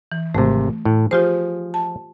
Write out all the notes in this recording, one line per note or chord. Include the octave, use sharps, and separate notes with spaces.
E3
G#1 C3 A3
A2
F3 F4 G4 G#4 C5
A5